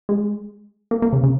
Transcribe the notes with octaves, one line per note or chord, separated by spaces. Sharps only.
G#3
A#3
A#3
C#3
C#3